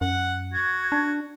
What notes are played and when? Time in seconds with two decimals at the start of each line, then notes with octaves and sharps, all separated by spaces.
0.01 F#2 F#5
0.53 F#4 C#6 G#6
0.92 D4